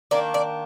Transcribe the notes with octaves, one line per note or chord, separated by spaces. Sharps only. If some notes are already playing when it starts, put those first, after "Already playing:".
D#3 A#3 D4 D5
D5